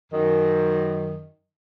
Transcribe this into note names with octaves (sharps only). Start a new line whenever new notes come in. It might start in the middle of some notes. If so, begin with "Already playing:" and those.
F#2 D#3